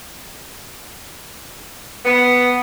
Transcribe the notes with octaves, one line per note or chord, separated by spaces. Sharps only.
B3